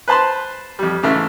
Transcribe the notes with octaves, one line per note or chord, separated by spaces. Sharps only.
B4 C5 A5 B5 C6
F2 G3
G#2 C#3 E3 A3